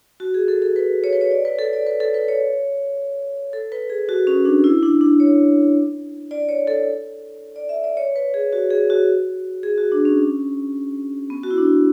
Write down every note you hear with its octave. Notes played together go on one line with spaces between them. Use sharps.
F#4
G#4
A4
A4
B4
C#5
B4
C#5
D5
B4
A4
D5
B4
A4
B4
C#5
A4
B4
G#4
F#4
C#4
D4
E4
D4
D4
C#5
D5
C#5
A4
D5
E5
D5
C#5
B4
G#4
F#4
G#4
F#4
G#4
F#4
D4
C#4
B3
F#4
E4
D4